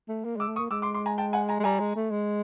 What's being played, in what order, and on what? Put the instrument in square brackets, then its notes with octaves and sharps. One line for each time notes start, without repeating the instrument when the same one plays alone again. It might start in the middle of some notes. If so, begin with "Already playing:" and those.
[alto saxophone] A3
A#3
[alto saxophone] G#3 [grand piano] D6 E6
[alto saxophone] A3
[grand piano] C#6 D#6
[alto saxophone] A#3
[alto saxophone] G#3 [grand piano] D6 E6
[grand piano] C6 D6
C6 D6
G#5 A#5
G5 A5
F#5 G#5
G#5 A#5
[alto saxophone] G#3
[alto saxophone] G3 [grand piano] G#5 A#5
[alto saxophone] G#3
A3
G#3